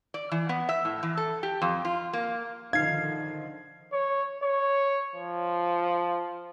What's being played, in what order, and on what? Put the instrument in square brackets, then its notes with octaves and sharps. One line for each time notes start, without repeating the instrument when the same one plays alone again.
[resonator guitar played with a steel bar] D5
E3
B3
E5
A2
E3
A4
G4
F2
F4
A#3
[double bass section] D3 D#3 F3 [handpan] D#4 F5 [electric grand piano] G#6 C7
[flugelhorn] C#5
C#5
F3